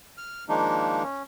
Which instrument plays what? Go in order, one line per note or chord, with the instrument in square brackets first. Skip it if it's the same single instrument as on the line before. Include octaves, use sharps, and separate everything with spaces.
[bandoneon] F6
D#3 F3 G#3 A#3 D4 D#4
C#4